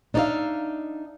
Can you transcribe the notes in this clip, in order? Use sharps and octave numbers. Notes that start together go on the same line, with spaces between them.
D4 D#4 F#4 D5 E5 F5